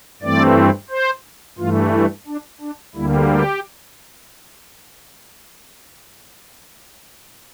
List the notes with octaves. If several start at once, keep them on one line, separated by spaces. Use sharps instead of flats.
G2 E3 A3 C4 D5
C5
G2 E3 A3 F4
E4
D4
D4
D2 D3 G3 A#3 E4
G4